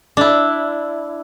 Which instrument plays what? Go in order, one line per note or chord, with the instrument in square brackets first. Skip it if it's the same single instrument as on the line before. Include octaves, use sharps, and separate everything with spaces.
[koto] D4 E4